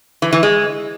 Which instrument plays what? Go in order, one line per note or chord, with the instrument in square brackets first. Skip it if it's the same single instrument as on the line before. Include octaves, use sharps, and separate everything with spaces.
[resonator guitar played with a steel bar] E3
E3
G#3